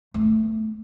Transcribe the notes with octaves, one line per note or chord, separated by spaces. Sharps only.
A3 B3